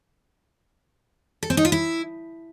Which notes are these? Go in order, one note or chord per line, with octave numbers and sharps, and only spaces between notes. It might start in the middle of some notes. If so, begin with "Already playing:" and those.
A4
C4
D#4
F4
E4